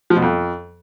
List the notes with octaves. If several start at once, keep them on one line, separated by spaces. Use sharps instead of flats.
F3
B2
F2